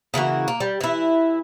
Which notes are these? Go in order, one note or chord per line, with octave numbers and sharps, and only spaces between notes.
C#3 E3 A#3 F#4
A#3
G3
E3 E4